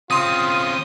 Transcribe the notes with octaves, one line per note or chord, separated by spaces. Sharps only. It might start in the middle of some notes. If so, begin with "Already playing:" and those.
C#3 C4 F4 C6 D#6 D#7